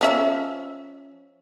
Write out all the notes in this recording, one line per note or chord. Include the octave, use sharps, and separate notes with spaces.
F3 C#4 E5